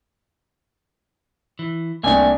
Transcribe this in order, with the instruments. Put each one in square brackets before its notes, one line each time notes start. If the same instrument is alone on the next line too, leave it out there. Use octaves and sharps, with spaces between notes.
[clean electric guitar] E3
[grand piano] C2 D4 [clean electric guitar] A3 A#3 G#5